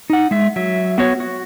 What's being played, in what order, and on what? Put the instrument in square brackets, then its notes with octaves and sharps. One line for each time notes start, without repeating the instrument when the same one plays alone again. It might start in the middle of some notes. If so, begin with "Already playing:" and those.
[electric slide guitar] D#4 F#5
G#3 E5
F#3 E5
B3 F#4 C#5
F#4